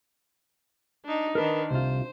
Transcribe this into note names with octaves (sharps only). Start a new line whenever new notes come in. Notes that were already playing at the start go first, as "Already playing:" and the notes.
D4 D#4
D#3 D4 A#4 B4
C2 C3 F4 C5